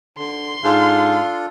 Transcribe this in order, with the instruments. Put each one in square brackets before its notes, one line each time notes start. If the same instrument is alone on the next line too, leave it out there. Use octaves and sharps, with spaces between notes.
[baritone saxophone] D3 [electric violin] C6
[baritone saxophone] G#2 [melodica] D4 F4 A4 [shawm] F5